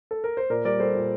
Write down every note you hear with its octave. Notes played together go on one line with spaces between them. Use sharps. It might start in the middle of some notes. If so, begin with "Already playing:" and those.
A4
A#4
C5
A#2 A#4 D5
G3 A#4 D5
G3 A4 C5
A#2